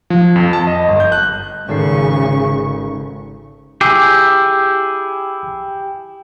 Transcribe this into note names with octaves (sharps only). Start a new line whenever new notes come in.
F3
F2
A5
D#5
G1
G6
F#6
G#1 C#3 A4 C#6 C7
E4 G4 G#4 D6 E6